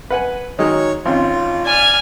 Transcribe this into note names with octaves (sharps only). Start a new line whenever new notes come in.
B4 F#5 G#5
D#3 F#3 G#3 C#5
G#1 C4 C#4 F4
D5 G#5 F6